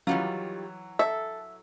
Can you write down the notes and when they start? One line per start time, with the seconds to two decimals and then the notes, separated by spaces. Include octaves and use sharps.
0.07 D#3 E3 F#3 G3 F4
0.99 A4 E5